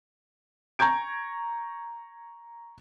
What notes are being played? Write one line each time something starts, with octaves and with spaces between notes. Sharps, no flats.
A#5 C#6 G6 G#6 D7